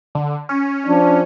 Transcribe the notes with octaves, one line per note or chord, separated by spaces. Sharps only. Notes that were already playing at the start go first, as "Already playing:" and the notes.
D3
C#4
F3 D4